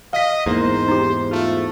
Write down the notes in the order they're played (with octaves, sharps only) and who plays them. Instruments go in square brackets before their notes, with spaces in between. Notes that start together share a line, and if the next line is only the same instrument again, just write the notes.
[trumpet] D#5 [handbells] F5 B6
[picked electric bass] E2 G#2 [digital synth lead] A#3 [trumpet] C5
[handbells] D#4 G4
[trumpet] A3 [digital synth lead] F4